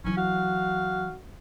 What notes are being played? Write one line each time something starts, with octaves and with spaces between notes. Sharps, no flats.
E3 F#3 C#4
F#4 F5